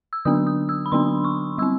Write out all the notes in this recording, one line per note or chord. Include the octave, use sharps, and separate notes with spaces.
E6
D3 F#3 B3 D4 D#6
D#6
E6
B5
D3 F#3 B3 D4 C6
C#6
G3 C4 E6